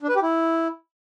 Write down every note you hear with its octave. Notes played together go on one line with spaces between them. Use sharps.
D4
B4
G4
E4